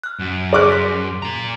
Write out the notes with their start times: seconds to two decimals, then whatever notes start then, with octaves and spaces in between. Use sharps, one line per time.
0.04 F6 F#6
0.19 F#2
0.53 G#4 D5 C#6 D6 F6 F#6
0.70 C6 A#6 B6
1.22 A#2 A#5